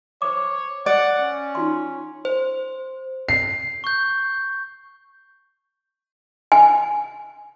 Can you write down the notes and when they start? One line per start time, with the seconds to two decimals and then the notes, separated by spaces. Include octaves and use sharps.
0.22 C5 C#5 D6
0.86 D5 F#5 D6
1.19 C#4
1.55 D#4 F4 C6
2.25 C5
3.29 C7
3.84 C#6 G6
6.52 G#5